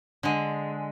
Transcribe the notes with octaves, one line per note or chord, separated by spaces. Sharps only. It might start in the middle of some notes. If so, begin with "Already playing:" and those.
D3 G#3